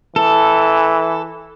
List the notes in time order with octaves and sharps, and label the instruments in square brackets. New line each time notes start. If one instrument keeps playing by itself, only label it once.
[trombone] E3 [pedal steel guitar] A4